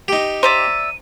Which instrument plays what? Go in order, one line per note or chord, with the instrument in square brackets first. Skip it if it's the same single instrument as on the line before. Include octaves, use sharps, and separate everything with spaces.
[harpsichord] D#4 G4
[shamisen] C5 [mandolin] D5 E5 A#5 [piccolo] D#7